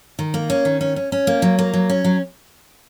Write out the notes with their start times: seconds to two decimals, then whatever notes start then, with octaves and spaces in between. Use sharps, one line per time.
0.19 D#3
0.34 A#3
0.50 C#4
0.65 D#3
0.81 C#4
0.96 C#4
1.12 C#4
1.27 A#3
1.42 F#3
1.59 A#3
1.74 F#3
1.90 C#4
2.04 F#3